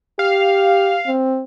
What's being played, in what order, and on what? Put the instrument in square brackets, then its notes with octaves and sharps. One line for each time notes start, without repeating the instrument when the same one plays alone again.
[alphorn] G4 [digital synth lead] F5
[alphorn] C4